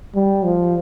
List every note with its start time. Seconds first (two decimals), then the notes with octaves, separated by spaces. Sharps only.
0.15 G3
0.44 F3